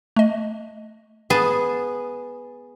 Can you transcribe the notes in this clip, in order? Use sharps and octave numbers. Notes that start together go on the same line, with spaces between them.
A3 D#5
B3 G#4 A5